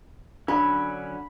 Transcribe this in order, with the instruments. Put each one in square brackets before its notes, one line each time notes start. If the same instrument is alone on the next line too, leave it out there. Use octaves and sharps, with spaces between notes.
[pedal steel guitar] D3 F#3 C#4 [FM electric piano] D4 [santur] B5